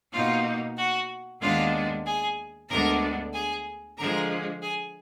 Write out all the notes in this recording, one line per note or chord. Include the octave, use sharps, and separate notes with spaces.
B2 A#3 D#4 F4 F5
F#4 F#5
D#2 D#3 G#3 B3 D4 F4 F5
G#4 G#5
D2 D3 G#3 B3 D4 A#4 A#5
G#4 G#5
D3 F3 G#3 A#4 A#5
G#4 G#5